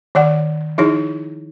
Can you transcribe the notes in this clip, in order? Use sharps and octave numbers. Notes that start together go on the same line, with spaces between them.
D#3 C#5 D5 F#5
F3 D#4 E4 G#4 C#5